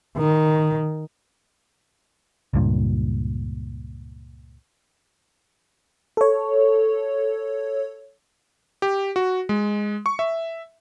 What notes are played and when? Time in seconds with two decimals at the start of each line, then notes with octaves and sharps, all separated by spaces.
0.17 D#3
2.53 C#2 G2 A#2
6.17 A4 C#5
8.82 G4
9.16 F#4
9.49 G#3
10.06 C#6
10.19 E5